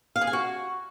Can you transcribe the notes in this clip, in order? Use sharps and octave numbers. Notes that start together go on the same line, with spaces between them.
F5
G#4
G#5
F#4